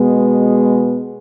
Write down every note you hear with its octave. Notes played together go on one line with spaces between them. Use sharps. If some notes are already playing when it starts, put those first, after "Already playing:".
Already playing: B2 G#3 B3